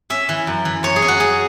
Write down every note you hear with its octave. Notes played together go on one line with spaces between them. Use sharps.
C#4 E5
E3
F#2
E3
F#2 C#5
G#4
C#4
F#4
C#4 G#4